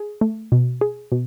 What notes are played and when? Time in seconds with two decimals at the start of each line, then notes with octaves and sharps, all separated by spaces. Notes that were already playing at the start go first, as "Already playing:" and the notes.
Already playing: G#4
0.21 A3
0.52 B2
0.81 G#4
1.12 B2